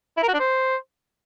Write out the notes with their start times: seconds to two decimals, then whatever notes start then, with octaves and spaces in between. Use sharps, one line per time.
0.17 E4
0.23 A#4
0.28 F#4
0.34 D4
0.39 C5